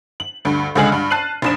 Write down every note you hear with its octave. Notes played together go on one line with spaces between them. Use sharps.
F#7
D2 G2
C#2 D3 G#3 G#4 F6 F#7
G2
A5 F#6 C7 D#7 F#7
F1 A#1 E7